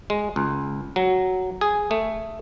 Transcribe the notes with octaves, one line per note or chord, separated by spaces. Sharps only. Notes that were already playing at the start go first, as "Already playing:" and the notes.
G#3
C#2
F#3
G#4
A3